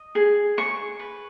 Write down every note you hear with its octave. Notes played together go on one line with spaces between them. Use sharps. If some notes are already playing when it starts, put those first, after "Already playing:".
Already playing: D#5
G#4
G#4 C#6
B4